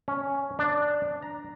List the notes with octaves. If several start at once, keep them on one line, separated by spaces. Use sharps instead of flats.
C#4
D4
A#5